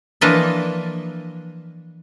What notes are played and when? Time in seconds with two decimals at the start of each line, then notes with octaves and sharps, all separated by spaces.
0.21 E3 F3 A#3 D4 D#5 E5